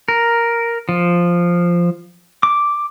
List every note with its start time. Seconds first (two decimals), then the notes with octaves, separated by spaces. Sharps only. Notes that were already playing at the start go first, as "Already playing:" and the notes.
0.08 A#4
0.89 F3
2.43 D6